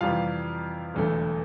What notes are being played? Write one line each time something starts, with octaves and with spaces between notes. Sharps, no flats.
F2 C3 E3 G3 F4 F5
E1 E2 D3 A3